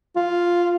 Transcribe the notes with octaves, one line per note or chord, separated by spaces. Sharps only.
F4